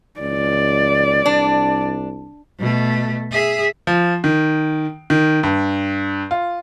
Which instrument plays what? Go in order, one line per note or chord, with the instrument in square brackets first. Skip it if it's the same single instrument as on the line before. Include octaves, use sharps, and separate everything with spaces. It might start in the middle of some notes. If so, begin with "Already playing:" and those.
[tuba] C#2 [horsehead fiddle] D5
[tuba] C2 [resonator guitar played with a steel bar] D4
[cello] B2 A3
G#4 E5
[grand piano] F3
D#3
D#3
G2
F4